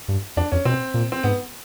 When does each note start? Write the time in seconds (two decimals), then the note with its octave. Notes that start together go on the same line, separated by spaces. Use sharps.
0.08 G2
0.37 F2 D4
0.52 F2 C#4
0.65 B2 C4
0.94 A#2
1.12 C4
1.23 G#2 B3